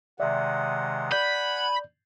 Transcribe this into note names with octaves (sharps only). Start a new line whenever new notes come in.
C3 D#3 G#3 D5 E5 F#5
D5 G#5 B5 G6